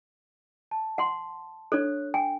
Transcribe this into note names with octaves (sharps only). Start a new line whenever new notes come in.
A5
F#5 C6
D4 A4 C#5 F#6
G5 G#5